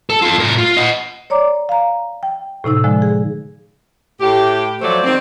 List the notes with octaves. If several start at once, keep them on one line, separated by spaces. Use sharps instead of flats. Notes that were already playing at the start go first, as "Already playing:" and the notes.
A4
F4 A4
A2 A#4
F4
D#5 F#5
C#5 D5 A#5 D6
F5 A#5
G5
A2 C3 D#4 E6
D3 F3 G#3
G#4
A2 G4
F3 F#3 A3 C5 D5
D#3 G3 C4